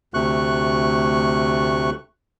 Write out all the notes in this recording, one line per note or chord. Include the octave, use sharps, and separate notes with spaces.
D2 C3 A3 C#6 F#6